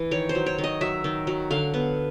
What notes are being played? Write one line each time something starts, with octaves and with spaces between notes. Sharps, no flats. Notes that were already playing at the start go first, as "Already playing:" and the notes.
Already playing: E3
D#3 C#5
C5
F#3
C#5
D#3
D#5
F#3 E5
D#3
F#3
D3 F5
B3